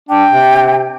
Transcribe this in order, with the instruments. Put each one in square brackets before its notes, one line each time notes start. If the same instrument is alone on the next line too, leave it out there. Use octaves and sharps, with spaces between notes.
[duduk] D4 [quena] G5
[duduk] C3